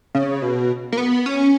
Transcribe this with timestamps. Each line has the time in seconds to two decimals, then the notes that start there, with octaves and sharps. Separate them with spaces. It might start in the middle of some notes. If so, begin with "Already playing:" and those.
0.15 C#3
0.42 B2
0.92 A#3
0.98 B3
1.26 C#4